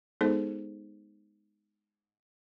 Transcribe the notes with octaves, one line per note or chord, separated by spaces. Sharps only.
G#3 B3 D#4 G#4 A4 C5